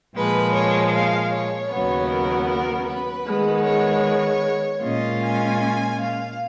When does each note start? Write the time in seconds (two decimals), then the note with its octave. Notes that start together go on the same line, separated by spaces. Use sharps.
0.16 A#2 F3 G#3 B4
0.55 C#5
0.93 F5
1.33 C#5
1.71 D#2 C#3 F#3 B3
2.10 A#4
2.49 A#4
2.88 B4
3.27 D#3 G#3 B3
3.66 C#5
4.82 A#2 G#3 C#4 F4 D#5
5.21 G#5
6.00 F5